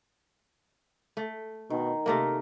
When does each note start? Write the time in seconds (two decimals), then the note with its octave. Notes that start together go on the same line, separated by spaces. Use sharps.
1.17 A3
1.70 B2 D#3
2.06 C3 A3 A#3 A#4